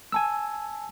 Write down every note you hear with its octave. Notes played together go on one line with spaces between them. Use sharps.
G#5 A5 E6